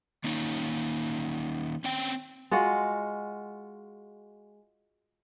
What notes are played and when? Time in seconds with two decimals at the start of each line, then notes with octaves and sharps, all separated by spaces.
0.24 D#3 A#3 C#4 D#4
1.84 C4 C#4 G5
2.51 G#3 F4 F#4 F#5